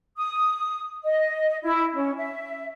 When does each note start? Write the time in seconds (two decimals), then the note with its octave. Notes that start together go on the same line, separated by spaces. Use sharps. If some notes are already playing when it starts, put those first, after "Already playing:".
0.17 D#6
1.04 D#5
1.63 E4
1.94 C#4
2.17 E5